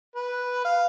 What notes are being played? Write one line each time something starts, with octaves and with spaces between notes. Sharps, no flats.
B4
F5